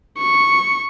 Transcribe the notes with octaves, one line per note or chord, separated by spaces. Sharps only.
C#6